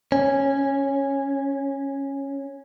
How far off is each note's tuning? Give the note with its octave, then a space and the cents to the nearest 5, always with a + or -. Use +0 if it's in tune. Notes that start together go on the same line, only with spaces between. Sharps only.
C#4 -10